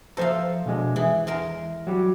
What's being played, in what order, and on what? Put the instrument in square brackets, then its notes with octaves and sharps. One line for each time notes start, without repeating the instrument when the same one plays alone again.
[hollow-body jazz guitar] F3 C5 A#5 [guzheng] A4 E5 F5
[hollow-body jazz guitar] B2 D3 G#3
[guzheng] E3 [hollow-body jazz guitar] G#4
[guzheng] E2 G#3 A#4
[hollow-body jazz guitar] F#3 G3